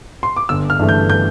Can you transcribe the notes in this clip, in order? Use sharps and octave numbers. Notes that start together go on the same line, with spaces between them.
C6
D6
G1 E6
F6
G2 E3 A3
G6
G6